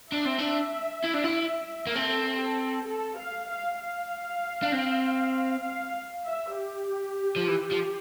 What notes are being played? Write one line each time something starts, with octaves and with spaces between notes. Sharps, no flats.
D4 E5
C4
D4
E4
D4
E4
A#3
C4 A4
A4
A4
F5
F5
F5
D4
C4
F5
E5
G4
F3
E3
F3